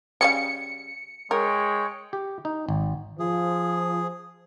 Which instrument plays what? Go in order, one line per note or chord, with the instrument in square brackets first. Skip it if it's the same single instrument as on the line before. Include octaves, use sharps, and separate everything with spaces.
[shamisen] C#3 G3 F5 [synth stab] C#7
[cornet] G#3 [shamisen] A#4 [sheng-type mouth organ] C#5 G5
[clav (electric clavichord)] G4
D#4
G#1
[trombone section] F3 [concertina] G#4